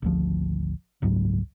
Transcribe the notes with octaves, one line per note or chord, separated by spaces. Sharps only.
G#1 D2 F3
F#1 C#2 G#2 F#3